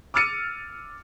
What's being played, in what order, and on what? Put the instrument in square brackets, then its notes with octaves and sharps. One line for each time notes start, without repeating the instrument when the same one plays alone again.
[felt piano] D6 E6 F6 A6 C#7 D#7